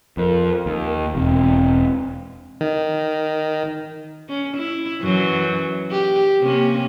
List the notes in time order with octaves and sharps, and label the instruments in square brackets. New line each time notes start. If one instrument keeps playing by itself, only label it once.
[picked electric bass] F2 [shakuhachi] A#4
[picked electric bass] D#2
[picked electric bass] E1 [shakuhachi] C4
[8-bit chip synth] D#3
[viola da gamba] C#4
E4
F#2 E3 F#3
G4
C3 A#3 C#4